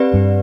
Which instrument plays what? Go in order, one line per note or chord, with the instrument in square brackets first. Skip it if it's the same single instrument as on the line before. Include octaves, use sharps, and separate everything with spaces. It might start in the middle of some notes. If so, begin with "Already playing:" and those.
Already playing: [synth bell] C4 G4 B4 D5
[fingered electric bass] G2